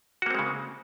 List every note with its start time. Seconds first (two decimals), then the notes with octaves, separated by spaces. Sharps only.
0.22 F#4
0.26 A#3
0.30 C4
0.35 G#3
0.39 C#3